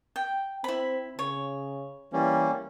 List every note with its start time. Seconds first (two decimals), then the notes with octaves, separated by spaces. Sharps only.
0.16 G5
0.64 C4 E4 B5
1.19 C#3 C#5
2.13 E3 G3 A#3 C#4